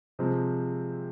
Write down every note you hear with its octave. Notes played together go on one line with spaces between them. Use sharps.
C3 F3 G#3 C4